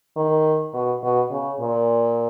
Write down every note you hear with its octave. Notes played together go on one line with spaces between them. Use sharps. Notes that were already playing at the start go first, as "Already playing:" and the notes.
D#3
B2
B2
C#3
A#2